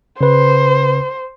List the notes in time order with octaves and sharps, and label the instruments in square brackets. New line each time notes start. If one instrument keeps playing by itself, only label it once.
[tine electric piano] C#3 B4 [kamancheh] C5